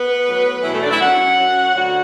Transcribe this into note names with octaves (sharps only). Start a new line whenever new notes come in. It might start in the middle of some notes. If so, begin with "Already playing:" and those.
Already playing: B3 B4
A2 F#3
E2 B2 E3 F#3 E4
A3 A4
D4 D5
E4 E5
F#2 F#3 F#4 F#5
F#2 F#3
D2 D3 F#3 F#4 F#5